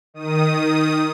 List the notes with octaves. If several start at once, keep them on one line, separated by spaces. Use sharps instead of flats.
D#3 D#6